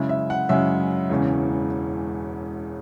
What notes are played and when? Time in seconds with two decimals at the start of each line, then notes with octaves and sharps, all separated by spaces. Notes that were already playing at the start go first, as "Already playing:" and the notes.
Already playing: F#2 C#3 G#3 C#4 E4
0.09 E5
0.30 F#5
0.49 F#2 C#3 G#3 C#4 E4 E5
1.09 E1 E2 C#3 E3 C#4